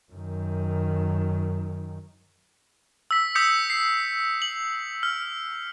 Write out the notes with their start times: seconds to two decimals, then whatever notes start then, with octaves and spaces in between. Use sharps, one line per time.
0.12 F#2 D#3
3.11 E6 B6
3.35 D#6 G6 B6 C#7
3.70 C7
4.42 F#7
5.03 F6